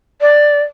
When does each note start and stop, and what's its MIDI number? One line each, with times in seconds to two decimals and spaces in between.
0.21 0.62 74